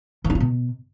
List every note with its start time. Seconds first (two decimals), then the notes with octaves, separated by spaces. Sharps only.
0.24 E3
0.30 D4
0.35 F4
0.40 B2